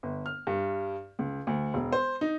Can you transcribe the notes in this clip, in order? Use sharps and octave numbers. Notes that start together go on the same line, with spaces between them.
G1
F6
G2
C#2
D2
E1
C5
D#4